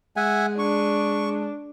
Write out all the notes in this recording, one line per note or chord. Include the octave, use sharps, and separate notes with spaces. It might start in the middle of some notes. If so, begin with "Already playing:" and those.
G#3 E5 F#5 G#5
D4 C#6